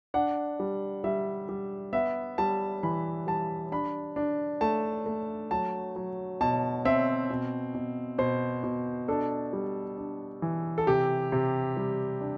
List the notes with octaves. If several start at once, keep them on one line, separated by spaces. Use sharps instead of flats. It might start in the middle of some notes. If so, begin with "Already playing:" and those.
D4 F#5
G3
G3 E5
G3
B3 E5
G3 A5
E3 B5
G3 A5
D4 B5
D4
A3 A5
A3
F#3 A5
F#3
B2 A5
C4 E5
B2
B2
B2 C5
B2
D4 A4
G3
D4
E3
A4
C3 G4
C3
G3
D4